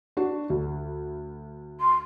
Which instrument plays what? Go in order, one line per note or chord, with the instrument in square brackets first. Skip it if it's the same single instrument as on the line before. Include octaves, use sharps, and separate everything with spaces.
[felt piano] D4 F#4
D2
[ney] C6